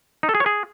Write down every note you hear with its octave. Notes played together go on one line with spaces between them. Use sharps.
D#4
A4
G#4
C#5
G#4